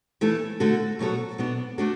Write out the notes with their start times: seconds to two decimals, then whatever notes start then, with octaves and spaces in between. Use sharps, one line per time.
0.21 E3 A3 E4 A4
0.60 D3 A3 F#4 A4
0.99 B2 F#3 B3 F#4 A4
1.38 B2 B3 D4
1.78 A3 D4 F#4 A4